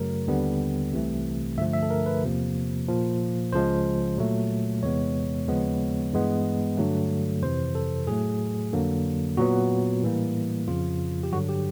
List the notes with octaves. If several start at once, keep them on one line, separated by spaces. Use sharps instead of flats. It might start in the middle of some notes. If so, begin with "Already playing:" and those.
Already playing: F#2 C#3 F#3 A3 A#4
D#2 D3 G3 B3
C2 C3 E3 A3
G2 D3 F3 A3 E5
E5
A4
A#4
B4
E2 C3 F3 A#3
A#2 F3 A#3
C#2 C#3 F3 G#3 C5
A#2 F#3 A3
E2 C3 E3 G#3 B3 C#5
D#2 C#3 F3 G#3 B3
G2 E3 G#3 B3
G2 D3 F#3 A3
F2 C3 E3 C5
A4
A2 F#3 A3 G#4
F2 D3 F#3 A#3
A#2 F#3 B3 F#4
A2 E3 G3 A#3
F2 C#3 F3 F4
G4
G2 D3 F#3 F#4
G4